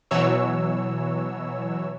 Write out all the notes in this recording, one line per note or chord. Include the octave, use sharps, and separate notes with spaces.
B2 E3 F#3 C#5 E6